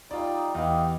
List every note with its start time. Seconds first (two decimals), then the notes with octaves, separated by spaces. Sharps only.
0.11 G3 D#4 F4 D5
0.55 E2 G4 D#5 F5